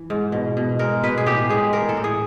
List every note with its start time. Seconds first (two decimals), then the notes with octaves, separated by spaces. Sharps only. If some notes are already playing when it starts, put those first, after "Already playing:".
Already playing: E3
0.10 G#2
0.32 B2
0.57 B2
0.79 G#3 A#4
1.03 B2 B4
1.18 G#4
1.26 A2 G4
1.49 G#3 G#4
1.73 E3 A#4
1.89 A4
1.97 A2
2.04 G#4